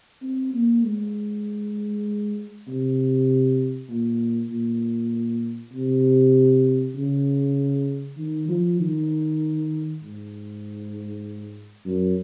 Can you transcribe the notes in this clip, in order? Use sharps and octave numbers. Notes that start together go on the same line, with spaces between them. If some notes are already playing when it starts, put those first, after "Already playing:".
C4
A#3
G#3
C3
A#2
A#2
C3
C#3
D#3
F3
D#3
G#2
F#2